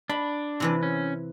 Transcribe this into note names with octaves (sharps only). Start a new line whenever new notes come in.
D4 B5
C3 E3 B4
C#4